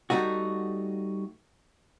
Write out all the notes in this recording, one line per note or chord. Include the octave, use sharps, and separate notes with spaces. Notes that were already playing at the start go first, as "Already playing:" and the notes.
G3 A3 D#4 F#4